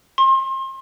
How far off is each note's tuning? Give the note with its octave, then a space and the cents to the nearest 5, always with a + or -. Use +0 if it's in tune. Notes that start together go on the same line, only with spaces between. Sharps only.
C6 +35